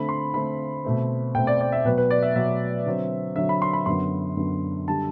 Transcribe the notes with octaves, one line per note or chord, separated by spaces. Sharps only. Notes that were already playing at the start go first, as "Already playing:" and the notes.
Already playing: D3 A3 C4 B5
C6
D3 A3 C4 B5
B2 A3 C4
B2 A3 C4 G5
D5
D5
E5
B2 F#3 B3 B4
B4
D5
E5
B2 F#3 B3 E5
D3 F#3 C4
D3 F#3 C4 E5
B5
C6
B5
F#2 D3 F#3 B3 C6
F#2 D3 F#3 B3
D3 G3 A5